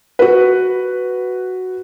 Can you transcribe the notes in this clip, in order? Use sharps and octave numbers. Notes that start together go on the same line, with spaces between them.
F#4 B4